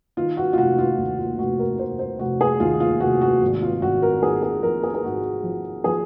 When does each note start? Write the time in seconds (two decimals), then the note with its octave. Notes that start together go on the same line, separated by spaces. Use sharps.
0.17 D#3 F4
0.37 F#4
0.53 F4
0.57 F1 F#4
0.78 F4
0.98 D#2
1.18 F4
1.39 F1 F#4
1.59 A#4
1.79 F1 C5
1.99 C5
2.19 F1 F#4
2.41 G#4
2.60 D#2 F4
2.80 F4
3.00 F1 F#4
3.21 F#4
3.41 G#1
3.62 F4
3.82 G#1 F#4
4.02 A#4
4.22 G#2 G#4
4.43 G#4
4.63 F3 A#4
4.83 G#4
4.94 G#4
5.04 G#2 F#4
5.44 F3
5.84 F3 G#4